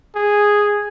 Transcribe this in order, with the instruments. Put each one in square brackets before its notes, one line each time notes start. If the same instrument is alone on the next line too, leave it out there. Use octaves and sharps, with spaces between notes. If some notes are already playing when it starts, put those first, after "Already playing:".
[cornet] G#4